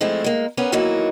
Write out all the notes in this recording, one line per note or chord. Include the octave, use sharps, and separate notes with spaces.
F3 G#3 A3 C4 E4
G#3 A#3
A#3 B3 C#4 A#4
D#3 E3 F#3 A#3 D#4 E4